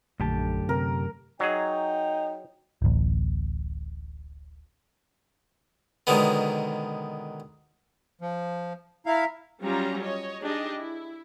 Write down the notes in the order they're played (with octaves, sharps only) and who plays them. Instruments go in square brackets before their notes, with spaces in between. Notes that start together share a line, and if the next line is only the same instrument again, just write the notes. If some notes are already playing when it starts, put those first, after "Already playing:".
[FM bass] A#1 [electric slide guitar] F#2 G4 A5 [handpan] D3 A3
[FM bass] C3 [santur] A#4
[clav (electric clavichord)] F#3 G#4 [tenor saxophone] D#4 [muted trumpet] G5
[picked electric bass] D1 A1
[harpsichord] B2 D3 D#3 F#3 G#3 B3
[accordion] F3
[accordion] E4 F5 [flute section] E5 A#5
[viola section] F#3 G3 C#4 F4 G4 A#5
C#5 D#5
D4 D#4 G4 G#4 D#5
E4